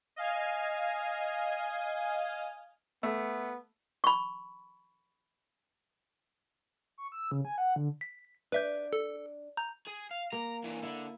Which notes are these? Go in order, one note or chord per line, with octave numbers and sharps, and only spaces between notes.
D#5 F5 G#5
A3 B3
B5 C#6
C#6
E6
C#3
G#5
F#5
D3
B6
D4 B4 D5 E5 G6
A4
A#5 G6
G#4
F5
A#3 A#5
D3 E3
D3 E4